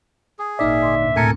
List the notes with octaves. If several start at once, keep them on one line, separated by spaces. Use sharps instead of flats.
G#4 D#6
G#1 A#2 A#3 D#4 D5 E5 F6
D3 C6 D6
D2 G#2 B2
A2 C4 A4 A#4 G#5 C#7